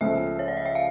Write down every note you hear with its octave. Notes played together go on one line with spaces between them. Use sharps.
C#2 C#3 F3 A3 E5
C#5
D5
D#5
E5
F5